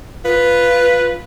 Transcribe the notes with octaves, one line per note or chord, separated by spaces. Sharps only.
F4 B4